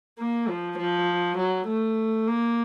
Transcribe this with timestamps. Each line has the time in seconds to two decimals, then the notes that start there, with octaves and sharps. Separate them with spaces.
0.19 A#3
0.49 F3
0.78 F3
1.38 F#3
1.68 A3
2.28 A#3